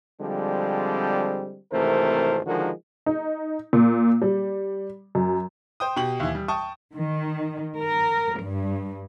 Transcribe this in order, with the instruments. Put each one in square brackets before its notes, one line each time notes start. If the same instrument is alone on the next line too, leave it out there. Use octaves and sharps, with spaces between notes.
[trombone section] D3 F3 G3 G#3 C4
G#1 C3 E3 A3 A#4 C5
D3 D#3 F3 G#3 F#4 A#4
[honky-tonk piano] D#4
A#2
G3
F#2
[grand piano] C5 G5 D#6
B2 G4 F#7
D#2 E3
G3
G5 A5 C#6 D#6
[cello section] D#3
A#4
G2